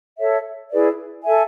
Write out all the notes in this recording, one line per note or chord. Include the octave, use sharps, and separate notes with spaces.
A4 C#5 E5
E4 G#4 B4 D5
A4 E5 G#5